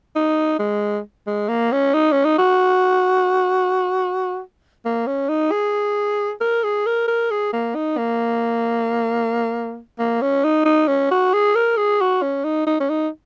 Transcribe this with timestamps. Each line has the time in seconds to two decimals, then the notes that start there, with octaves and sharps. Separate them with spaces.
0.16 D#4
0.59 G#3
1.27 G#3
1.49 A#3
1.72 C#4
1.94 D#4
2.12 C#4
2.25 D#4
2.38 F#4
4.85 A#3
5.07 C#4
5.29 D#4
5.51 G#4
6.41 A#4
6.64 G#4
6.86 A#4
7.08 A#4
7.31 G#4
7.53 A#3
7.75 D#4
7.98 A#3
9.99 A#3
10.22 C#4
10.44 D#4
10.65 D#4
10.88 C#4
11.11 F#4
11.33 G#4
11.55 A#4
11.77 G#4
12.01 F#4
12.22 C#4
12.44 D#4
12.67 D#4
12.80 C#4
12.90 D#4